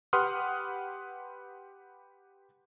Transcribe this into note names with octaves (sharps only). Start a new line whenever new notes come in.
G4 B4 F#5 C6 D#6 F6